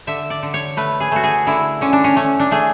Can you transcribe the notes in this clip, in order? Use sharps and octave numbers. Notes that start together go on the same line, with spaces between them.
D3 E5
D5
D3
C#5
A3 B4
G#4
A3 F#4
G#4
D3 E4
D3 C#4
D4
C#4
A3 C#4
D4
A3 G#4